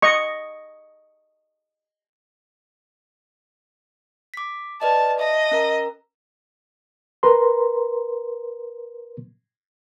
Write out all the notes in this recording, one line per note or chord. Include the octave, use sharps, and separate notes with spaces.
D#5 C#6
D6 B6
B4 D5 D#5 A5
D#5 E5 A5
C#4 A#4 A#5
A#4 B4 A#5 C6